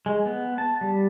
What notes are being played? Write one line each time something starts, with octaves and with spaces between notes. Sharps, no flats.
G#3
B3
A5
G3